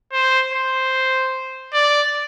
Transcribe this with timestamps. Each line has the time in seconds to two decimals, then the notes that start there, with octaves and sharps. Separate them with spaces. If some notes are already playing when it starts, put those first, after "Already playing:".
0.12 C5
0.53 C5
1.74 D5